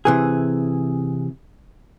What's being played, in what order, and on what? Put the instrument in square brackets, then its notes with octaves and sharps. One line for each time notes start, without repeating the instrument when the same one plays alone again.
[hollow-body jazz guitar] C3 E3 G#4